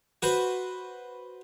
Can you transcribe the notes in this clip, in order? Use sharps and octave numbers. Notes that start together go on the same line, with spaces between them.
F#4 B4 C5